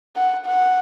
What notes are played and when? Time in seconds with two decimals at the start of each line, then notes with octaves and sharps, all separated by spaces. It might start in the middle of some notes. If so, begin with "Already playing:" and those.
0.16 F#5
0.46 F#5